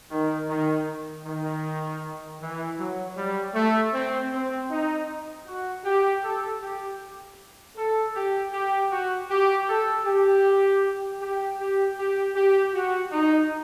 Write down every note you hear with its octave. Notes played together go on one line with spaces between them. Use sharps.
D#3
D#3
D#3
E3
F#3
G3
A3
C4
C4
D#4
F#4
G4
A4
G4
A4
G4
G4
F#4
G4
A4
G4
G4
G4
G4
G4
F#4
D#4